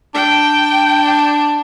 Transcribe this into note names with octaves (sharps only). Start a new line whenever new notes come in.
D4 G5